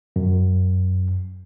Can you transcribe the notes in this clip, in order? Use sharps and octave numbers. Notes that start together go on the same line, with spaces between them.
F#2